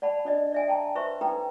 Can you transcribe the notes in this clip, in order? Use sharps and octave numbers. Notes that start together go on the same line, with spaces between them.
D5 F#5 A5 B5
D4 D5 D#5
D5 E5 G#5
G5 A5 A#5
B4 C5 E5 C6 C#6
D#4 A4 B4 G5 A#5